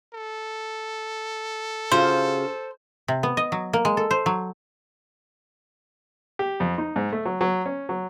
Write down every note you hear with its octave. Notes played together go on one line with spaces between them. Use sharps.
A4
C#3 F4 F#4 C5
C3
B3
D#5
F#3
A#3
G#3
A4
C5
F#3
G4
F2
D#4
G#2
A3
F#3
F#3
C#4
F#3